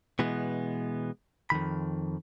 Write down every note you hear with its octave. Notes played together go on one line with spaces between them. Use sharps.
B2 E3 G#3 B3
F2 G#2 D#3 B5